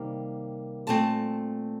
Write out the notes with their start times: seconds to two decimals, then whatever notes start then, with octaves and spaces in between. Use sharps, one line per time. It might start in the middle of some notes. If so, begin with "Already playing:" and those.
Already playing: C3 D#3 G3 A#3
0.87 A#2 A3 C4 A5